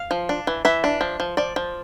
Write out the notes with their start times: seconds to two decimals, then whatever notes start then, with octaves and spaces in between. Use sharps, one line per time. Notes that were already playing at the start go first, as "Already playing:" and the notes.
Already playing: F5
0.11 F3
0.29 D4
0.47 E3
0.65 E3 E5
0.84 D4
1.01 F3
1.20 F3
1.37 F3 D5
1.56 F3